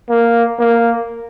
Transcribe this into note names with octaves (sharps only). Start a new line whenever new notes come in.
A#3
A#3